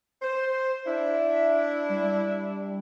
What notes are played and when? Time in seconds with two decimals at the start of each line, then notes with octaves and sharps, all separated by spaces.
0.22 C5
0.86 D4 E4 E5
1.89 G3